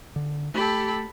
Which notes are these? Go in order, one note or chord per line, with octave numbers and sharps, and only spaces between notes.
D3
A3 G4 A4 B5